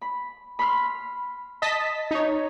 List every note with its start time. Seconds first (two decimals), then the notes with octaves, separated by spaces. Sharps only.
0.02 B5
0.59 B5 C6 F6
1.62 D#5 A5 B6
2.11 D#4 C#5